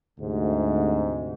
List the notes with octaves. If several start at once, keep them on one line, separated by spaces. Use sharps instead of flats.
D2 G#2 C3